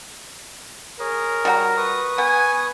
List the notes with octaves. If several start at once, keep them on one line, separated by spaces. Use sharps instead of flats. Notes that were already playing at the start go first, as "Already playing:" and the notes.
G#4 A#4 C#5
G3 F#4 A#5
B4 C#6 D#6
B3 G#5